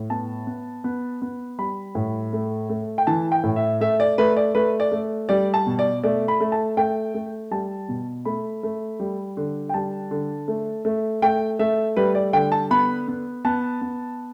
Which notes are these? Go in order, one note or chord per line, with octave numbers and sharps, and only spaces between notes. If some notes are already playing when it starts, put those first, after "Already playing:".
Already playing: A2
B3 A5
B3
B3
B3
G3 B5
A2
A3
A3
G5
E3 A5
G5
A2
E5
A3 E5
D5
A3 B4
D5
A3 B4
D5
A3
G3 D5
A5
B2
D5
A3 D5
B5
A3
A5
A3 G5
A3
G3 A5
B2
A3 B5
A3
G3
D3
G5
G3 A5
D3
A3
A3
A3 G5
A3 E5
G3 B4
D5
D3 G5
A5
B3 B5
B3
B3 A5
B3